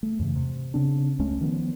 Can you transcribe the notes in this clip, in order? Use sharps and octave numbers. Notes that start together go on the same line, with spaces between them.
A3
E2 G2 C#3 E3
C3
C#3 C4 D4
C#2 G#3 A3 C#4
D#3 F3 A#3 B3